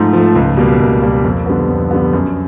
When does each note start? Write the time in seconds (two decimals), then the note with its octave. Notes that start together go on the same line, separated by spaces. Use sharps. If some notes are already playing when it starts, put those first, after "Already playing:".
Already playing: G#2 F3 A3
0.13 F3 A3
0.35 C#2
0.57 B2 G3 A#3
0.80 C#2
1.01 B2 G3 A#3
1.24 F2
1.46 D3 G3 B3
1.69 F2
1.91 D3 G3 B3
2.13 F#2